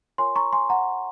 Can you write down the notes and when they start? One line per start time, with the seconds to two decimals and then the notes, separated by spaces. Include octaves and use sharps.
0.18 F4 A#4 C#5 G#5 C6
0.36 A#5 C#6
0.53 G#5 C6
0.70 F#5 A#5